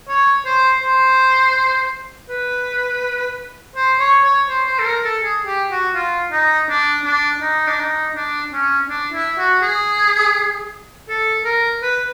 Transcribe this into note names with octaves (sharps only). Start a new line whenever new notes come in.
C#5
C5
C5
B4
C5
C#5
C#5
C5
C5
A4
A#4
A4
G#4
G4
F#4
F4
D#4
D4
D4
D#4
D4
D#4
D4
C#4
D4
E4
F#4
G#4
A4
A#4
B4